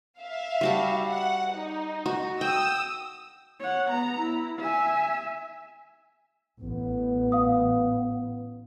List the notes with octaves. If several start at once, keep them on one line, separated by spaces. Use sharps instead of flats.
E5 F5
G3 F#4 A5
F#5
D#4
F#4
G5 D#6 E6
C#5 F#5
B3 A#5
E4
E5 G#5
A1 B3
F5 D#6